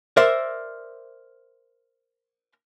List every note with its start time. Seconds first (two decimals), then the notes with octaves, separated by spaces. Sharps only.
0.17 A#4 C5 D5 E5